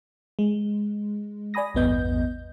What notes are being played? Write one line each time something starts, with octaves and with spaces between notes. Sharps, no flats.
G#3
D5 G#5 B5 D#6 A#6
A1 E2 G2 B3 D#5 G6